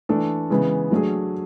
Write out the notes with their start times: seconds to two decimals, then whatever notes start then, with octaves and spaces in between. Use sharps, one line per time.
0.09 E3 A3 D4 A4
0.50 C#3 E3 G#3 B3
0.91 F#3 A3 D4 G#4